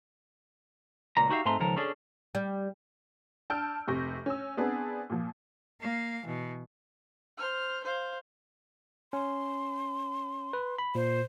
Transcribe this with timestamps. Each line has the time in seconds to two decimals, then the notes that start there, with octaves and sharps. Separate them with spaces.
1.17 C#2 A#2 A#5
1.30 D#4 F#4 G4 E5 F5
1.45 G#2 G#3 A3 C4 A#5 C6
1.60 C#2 D#3 F3 A4 A#4
1.77 C#4 D4 G#4 A4
2.35 G3
3.50 D4 A5 E6 F6 G6 D7
3.88 F1 C3 C#6 G6 A#6
4.26 C#4 E6
4.57 B3 C4 D4 G#4 B4
5.10 A#2 F3
5.80 A#3 F5
6.25 B2 E3
7.37 C5 F6
7.84 C5 F5
9.13 C#4 C6
10.53 B4
10.78 B5
10.95 A#2 C5